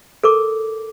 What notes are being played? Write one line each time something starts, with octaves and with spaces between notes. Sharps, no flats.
A4 A#4 D6